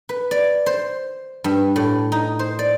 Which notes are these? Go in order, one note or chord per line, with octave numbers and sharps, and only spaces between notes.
B4
D5
C5
G2
A2
D#4
C5
D5